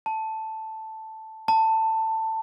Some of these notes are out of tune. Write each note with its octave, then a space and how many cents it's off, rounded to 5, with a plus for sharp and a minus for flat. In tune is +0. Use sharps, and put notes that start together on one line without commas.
A5 +0
A5 +15